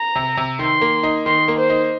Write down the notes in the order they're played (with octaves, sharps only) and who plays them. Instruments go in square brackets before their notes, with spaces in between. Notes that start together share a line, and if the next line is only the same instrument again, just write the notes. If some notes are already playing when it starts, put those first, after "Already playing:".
Already playing: [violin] A#5
[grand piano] C3
C3
[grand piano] D#3 [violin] C6
[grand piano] A#3
D#4
[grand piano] D#3 [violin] C6
[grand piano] A#3
[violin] C5
[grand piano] D#4